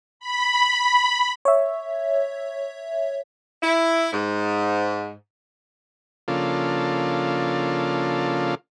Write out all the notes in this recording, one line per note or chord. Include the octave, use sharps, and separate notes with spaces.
B5
C#5 E5
E4
G#2
C#3 F3 A#3 D4 F4 A4